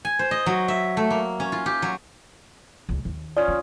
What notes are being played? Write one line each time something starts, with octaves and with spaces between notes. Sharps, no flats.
G#5
C5
D#5
F#3
E5
A3
A#3
C#4
F4
G4
F#3
C#2 A3
D#2
C#4 F4 D5 D#6
D4